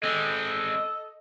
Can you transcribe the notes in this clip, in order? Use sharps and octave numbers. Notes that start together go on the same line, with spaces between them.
G#3 C4 A4 D#5